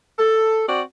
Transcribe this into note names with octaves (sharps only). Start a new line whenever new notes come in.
A4
C4 F#4 D5